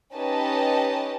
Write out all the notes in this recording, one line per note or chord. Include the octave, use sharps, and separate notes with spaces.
C#4 D#4 G4 B4 D#5 A5